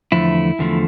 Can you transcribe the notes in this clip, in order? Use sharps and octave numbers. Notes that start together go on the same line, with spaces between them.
E2 D3 F3 A3 E4
E2 D3 F3 A3